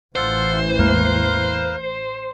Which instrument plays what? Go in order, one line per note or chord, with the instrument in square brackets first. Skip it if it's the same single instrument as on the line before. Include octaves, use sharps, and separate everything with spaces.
[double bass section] A1 E3 [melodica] F4 A4 F#5 [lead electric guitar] C5
[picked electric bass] E2 G#3 A#3 [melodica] A#4 B4 F5